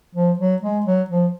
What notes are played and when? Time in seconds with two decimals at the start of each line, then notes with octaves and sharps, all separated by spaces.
0.15 F3
0.39 F#3
0.62 G#3
0.86 F#3
1.10 F3